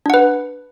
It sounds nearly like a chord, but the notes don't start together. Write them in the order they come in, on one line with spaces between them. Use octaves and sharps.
D4 F#5 B4